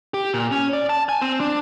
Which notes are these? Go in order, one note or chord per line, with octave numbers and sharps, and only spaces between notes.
G4
A#2
C#4
D5
A5
G#5
C4
D4